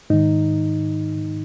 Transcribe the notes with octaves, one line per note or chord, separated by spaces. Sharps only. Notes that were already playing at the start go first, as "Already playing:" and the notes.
G#2 D#3 D#4